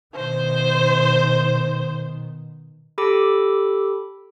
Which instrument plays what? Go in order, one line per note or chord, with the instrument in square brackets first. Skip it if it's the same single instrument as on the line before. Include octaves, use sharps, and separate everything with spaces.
[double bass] B2 D#3 [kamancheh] C5
[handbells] G4 A4 B5 D6 E6